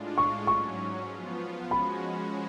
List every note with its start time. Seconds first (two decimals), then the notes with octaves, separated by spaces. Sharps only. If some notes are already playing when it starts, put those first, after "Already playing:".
Already playing: A2 G#3 D4 F4
0.18 C#6
0.47 G#2 F#3 C#4 C#6
1.10 F3 B3 F4
1.71 F3 G#3 C#4 F#4 B5